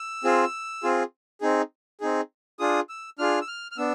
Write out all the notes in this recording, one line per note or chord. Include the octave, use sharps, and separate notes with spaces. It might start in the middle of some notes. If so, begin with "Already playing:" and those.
Already playing: E6
C4 F4 G#4
C4 F4 G#4
C4 D#4 G#4
C4 D#4 G#4
D4 F4 G#4 D#6
E6
D4 F4 G#4 F6
E6
F6
F6
B3 D4 E6